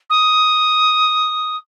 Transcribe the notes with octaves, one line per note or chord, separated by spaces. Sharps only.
D#6